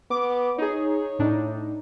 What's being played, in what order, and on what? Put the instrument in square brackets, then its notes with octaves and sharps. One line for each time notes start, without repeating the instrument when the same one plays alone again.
[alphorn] B3 [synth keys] D6
[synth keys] D#4 G#4 [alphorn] C#5
[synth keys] A2 D4 D#4